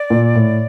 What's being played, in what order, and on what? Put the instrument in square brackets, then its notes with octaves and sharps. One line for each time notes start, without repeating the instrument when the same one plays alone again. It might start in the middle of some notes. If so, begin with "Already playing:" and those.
Already playing: [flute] D5
[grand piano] A#2
A2